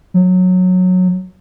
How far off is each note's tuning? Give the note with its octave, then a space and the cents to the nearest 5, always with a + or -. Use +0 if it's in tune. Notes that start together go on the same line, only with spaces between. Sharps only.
F#3 -15